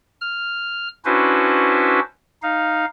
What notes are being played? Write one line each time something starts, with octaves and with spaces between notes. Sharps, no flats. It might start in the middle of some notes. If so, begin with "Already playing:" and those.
F6
C#4 D4 E4 F#4 B4 C5
D#4 F5